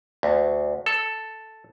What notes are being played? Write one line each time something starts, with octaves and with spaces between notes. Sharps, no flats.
D2
A4